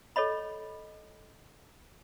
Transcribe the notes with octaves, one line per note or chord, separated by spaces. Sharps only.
A4 C#5 D#5 B5